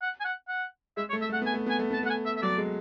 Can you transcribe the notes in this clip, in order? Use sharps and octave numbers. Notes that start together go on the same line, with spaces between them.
F#5
G#5
F#5
F#5
G#3 E5
C#5
A3
E5
A3 F#5
B3 G#5
A3
B3 G#5
A3
B3 A5
A3 F#5
G#5
E5
E5
F#3 D5
G#3